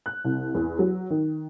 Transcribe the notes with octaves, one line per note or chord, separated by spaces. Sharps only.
F#6
C2
E2
F#3
D#3